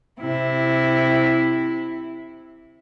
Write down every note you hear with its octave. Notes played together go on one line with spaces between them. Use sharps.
C3 E4